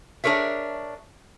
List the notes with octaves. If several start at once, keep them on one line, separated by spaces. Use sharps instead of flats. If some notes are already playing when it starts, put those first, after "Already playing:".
D4 G#4 A#4 C#5 E5